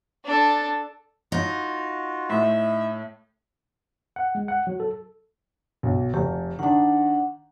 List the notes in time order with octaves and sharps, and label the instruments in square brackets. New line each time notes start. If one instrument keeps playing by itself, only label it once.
[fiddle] D4 A4
[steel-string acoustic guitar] D#4 [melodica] F4 F#4
[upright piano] A2 [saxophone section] E5
[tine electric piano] F#5
G#3
F#5
F#3
A4
[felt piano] B1
[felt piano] F1 [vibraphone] G4
[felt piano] D#3 D4 [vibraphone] F#5